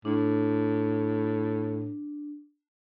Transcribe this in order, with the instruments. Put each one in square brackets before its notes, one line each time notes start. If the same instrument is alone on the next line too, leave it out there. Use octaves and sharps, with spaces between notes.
[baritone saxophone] A2 [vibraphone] D4